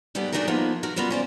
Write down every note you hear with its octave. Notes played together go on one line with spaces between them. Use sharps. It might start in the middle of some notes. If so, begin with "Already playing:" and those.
G#2 F#3 G3 A3 B3
A3 D4 D#4 F#4 G#4 A#4
F3 A#3 B3 D#4 F4
F#4 A#4
C#3 G3 B3 F4 A#4
C#4 C5 D5